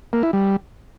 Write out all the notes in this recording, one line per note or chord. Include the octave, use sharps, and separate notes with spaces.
A#3
E4
G3